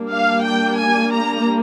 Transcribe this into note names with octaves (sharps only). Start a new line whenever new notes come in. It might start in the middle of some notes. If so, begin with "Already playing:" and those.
Already playing: G3 A#3 D4
F5
G5
G#5
A#5